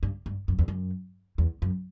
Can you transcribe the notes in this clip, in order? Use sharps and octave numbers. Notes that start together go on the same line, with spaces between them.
G2
G2
F#2
E2
F#2
E2
F#2